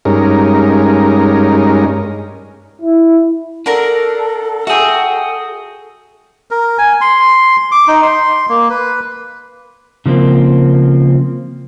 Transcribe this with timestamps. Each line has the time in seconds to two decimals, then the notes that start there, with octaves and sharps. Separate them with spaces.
0.05 G2 G#3 C#4 D#4 A#4
2.81 E4
3.66 D4 F#4 A4 A#4 A#5
4.67 F#4 G#4 E5 G5
6.51 A#4
6.78 G#5
7.01 C6
7.72 D6
7.88 D#4
8.03 C6
8.49 A#3
8.70 B4
10.06 C#3 F3 A#3 C4